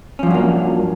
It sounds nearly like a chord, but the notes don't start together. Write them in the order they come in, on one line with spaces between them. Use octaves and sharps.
C#4 F3 G2 F#3 A#3